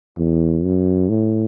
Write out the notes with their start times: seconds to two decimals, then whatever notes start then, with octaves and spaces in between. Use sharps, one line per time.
0.18 E2
0.64 F#2
1.09 A2